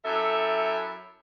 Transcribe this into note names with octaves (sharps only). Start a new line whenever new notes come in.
F#2 E4 A4 E5